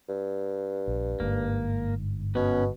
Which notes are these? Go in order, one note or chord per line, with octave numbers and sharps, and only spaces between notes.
G2
A#1
G1 G#2 A#3
B2 B3 C#4